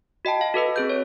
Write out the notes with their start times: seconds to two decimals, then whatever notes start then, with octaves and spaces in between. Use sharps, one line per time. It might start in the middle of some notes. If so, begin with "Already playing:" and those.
0.25 F#4 D#5 G5 A5
0.41 F5
0.54 F#4 A4 B4 D#5
0.76 C4 G#4 G6
0.89 C#5